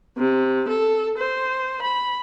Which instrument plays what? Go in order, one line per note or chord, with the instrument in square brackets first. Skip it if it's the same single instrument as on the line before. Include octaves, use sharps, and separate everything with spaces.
[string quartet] C3
A4
C5
B5